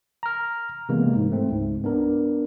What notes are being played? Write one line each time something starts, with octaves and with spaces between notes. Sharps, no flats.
A#5 F6
C3 E3 G#3 A#3 B3
G#2
A3 C4
C#2 G#2
B3 D4 A#4